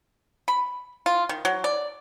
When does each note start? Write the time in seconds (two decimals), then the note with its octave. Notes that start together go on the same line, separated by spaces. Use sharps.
0.48 B5
1.06 F4
1.29 D#3
1.45 F#3
1.64 D5